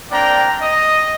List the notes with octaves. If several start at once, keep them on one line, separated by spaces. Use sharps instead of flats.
A#3 C4 D4 D5 G5 A#5
D#5